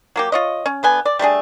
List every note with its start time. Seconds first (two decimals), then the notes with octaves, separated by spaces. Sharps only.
0.16 F#3 A#3 G4
0.32 F4 C#5 D#5
0.66 C#4
0.83 D3 B3 G#5
1.05 D5
1.19 G3 A3 D4 G#4